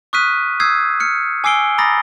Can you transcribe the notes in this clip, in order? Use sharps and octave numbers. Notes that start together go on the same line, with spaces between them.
C#6 D#6 F6 F#6 B6 D#7
D#6 E6 G6 G#6 C7
F6 C#7
G#5 D6 E6 C7 D7 G7
A#5 B5 D6 D#6 A6 A#6